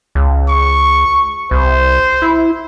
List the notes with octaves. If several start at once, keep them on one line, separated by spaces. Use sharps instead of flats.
C#2
C#6
C2 C5
E4